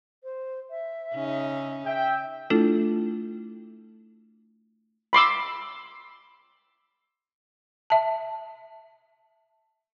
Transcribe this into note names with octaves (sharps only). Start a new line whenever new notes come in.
C5
E5
C#3 C#4 D#4
E5 G5
A3 D4 E4 F4 A4
B5 C6 D6 E6
E5 A5